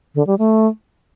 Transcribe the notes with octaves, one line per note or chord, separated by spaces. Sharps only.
D3
G3
A3